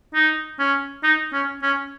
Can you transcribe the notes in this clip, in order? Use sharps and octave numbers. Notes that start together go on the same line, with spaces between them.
D#4
C#4
D#4
C#4
C#4